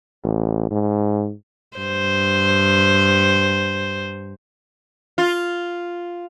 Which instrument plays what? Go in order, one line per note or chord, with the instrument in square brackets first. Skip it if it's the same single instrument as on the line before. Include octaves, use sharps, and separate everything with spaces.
[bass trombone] A1
G#2
[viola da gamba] G2 C5
[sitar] F4